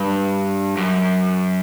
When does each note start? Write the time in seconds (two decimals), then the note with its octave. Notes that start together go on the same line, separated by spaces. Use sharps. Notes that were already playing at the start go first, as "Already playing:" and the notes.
Already playing: G2
0.77 F#2